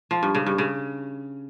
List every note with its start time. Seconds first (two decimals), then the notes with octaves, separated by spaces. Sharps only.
0.11 F3
0.23 G2
0.35 C#3
0.46 G2
0.58 C#3